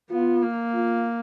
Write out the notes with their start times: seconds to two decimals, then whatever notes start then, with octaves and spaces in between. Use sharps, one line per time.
0.10 B3 F4
0.43 A#3
0.74 F4